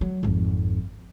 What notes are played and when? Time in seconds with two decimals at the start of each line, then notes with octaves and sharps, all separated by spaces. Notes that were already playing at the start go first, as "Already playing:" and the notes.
0.01 F#3
0.23 G#1 F2